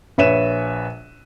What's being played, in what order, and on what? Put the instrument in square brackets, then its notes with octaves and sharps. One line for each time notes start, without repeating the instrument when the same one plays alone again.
[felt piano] A#1 B4 C#5 E5 D#7 E7